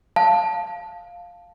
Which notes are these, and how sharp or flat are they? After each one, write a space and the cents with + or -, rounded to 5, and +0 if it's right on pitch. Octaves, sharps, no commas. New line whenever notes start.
F5 +5 A5 +0